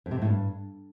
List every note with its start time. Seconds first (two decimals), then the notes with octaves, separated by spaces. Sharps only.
0.06 F2
0.11 C3
0.16 F2
0.22 A2
0.27 G2